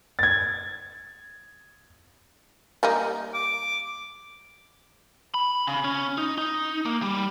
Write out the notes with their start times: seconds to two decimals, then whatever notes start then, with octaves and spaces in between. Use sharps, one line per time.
0.19 G#6 A6
2.83 G3 A#3 D#4
3.34 D6
5.34 B5
5.67 C#3
5.84 C#4
6.18 D#4
6.38 D#4
6.85 A#3
7.02 G3